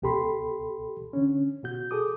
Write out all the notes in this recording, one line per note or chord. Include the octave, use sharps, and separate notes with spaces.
C#2 B2 G4 A4 B5 C6
D3 C#4
B2 F#4 G6
G#4 A4 D6 D#6